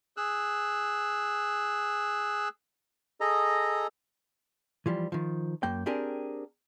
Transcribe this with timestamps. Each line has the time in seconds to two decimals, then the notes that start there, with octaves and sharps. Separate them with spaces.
0.17 G#4 E6 F#6
3.21 G#4 A4 D#5 A#5
4.86 E3 F3 G3
5.12 D#3 F3
5.63 F#2 A#3 G5
5.86 C4 D4 G4 G#4 A#4